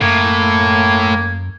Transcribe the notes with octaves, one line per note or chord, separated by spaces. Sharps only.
F#2 A2 A#3 G#6